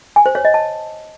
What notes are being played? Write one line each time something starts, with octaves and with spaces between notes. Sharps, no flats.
G#5
C5
C#5
D#5
A5